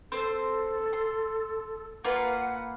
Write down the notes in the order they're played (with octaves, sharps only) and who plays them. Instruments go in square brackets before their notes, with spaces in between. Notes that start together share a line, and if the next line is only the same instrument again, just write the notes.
[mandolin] C4 C5 [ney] A4
[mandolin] C6
[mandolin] A#3 F4 B4 [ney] F#5